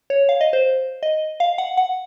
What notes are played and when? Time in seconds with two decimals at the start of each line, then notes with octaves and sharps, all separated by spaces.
0.10 C#5
0.29 F5
0.41 D#5
0.53 C5
1.03 D#5
1.40 F5
1.58 F#5
1.77 F#5